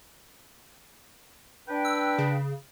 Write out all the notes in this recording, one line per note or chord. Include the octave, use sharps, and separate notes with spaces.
D4 B4 G5
E6
C#3